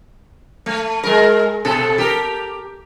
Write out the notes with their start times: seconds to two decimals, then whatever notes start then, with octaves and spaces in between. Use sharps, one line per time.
0.66 A3
1.03 G#3 A#4
1.65 B2 A4
1.98 G4 A#4